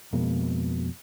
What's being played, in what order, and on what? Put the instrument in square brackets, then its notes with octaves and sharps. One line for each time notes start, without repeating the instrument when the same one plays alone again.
[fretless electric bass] F2 B2 G#3 A#3